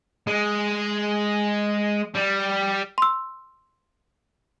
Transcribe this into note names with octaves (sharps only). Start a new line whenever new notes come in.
G#3
G3
C6 E6